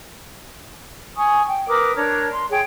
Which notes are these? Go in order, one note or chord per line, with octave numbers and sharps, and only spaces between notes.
G#5 C#6 D#6
G5
A#4 B4 D6 D#6
D4 A#4 C#5
C6
G#4 C#5 G5